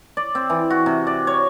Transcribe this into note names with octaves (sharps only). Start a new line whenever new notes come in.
D5
C4
E3
F#4
C3
D5
C#5